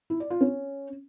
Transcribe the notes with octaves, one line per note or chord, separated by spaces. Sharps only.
E4
D5
F4
C#4